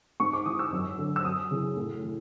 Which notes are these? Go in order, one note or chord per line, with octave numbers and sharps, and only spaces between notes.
G#2 C#6
D6
E3 D#6
E6
F#2
D3
E6
F#2 D#6
C#3 E3
A2
E3